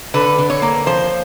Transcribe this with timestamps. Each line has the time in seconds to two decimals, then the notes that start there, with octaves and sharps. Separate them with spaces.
0.14 D3 B4
0.38 D3
0.50 C#5
0.62 A#3
0.86 F3 C5